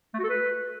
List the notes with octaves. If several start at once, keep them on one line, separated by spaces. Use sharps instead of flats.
A3
F#4
A4
B4